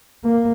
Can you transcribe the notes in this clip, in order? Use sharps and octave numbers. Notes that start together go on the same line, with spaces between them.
A#3